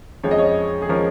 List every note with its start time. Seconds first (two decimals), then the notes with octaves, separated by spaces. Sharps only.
0.23 F2 F3 G#3 C#4 C#5
0.31 D#5
0.38 C#5
0.82 G#4
0.89 F3 G#3 C#4 A#4